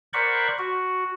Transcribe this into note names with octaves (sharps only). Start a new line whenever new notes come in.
A#4 C5 D5 F#5 B5 C#6
F#4